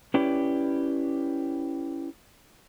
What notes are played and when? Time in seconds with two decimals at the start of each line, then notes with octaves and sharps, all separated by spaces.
0.14 C#4 E4 G4 B4 D5